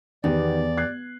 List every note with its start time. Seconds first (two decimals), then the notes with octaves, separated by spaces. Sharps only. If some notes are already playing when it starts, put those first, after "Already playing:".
0.24 E2 D#3 B3 G4 D5
0.77 F#6 G#6 C7